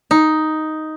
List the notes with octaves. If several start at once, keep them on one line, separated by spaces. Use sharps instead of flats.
D#4